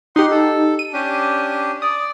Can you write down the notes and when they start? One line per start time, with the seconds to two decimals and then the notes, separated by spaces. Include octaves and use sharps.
0.16 D#4 G4 F#5 C6
0.31 A4
0.79 D#7
0.93 C#4 D4 G4
1.82 D5 D#6